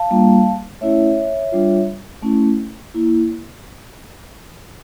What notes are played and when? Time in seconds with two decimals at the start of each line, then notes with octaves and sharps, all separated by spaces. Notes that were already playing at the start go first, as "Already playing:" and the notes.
Already playing: F5 A5
0.11 G3 A#3 D4 F4
0.81 A3 C#4 E4 C#5 E5
1.52 G3 D4 F4
2.23 A3 C#4 E4
2.94 A#3 E4